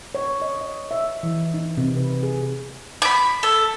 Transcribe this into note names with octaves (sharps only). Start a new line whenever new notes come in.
C#5
D#5
D#5
E5
E3
D#4
C3
B4
G#4
B5 D6
A4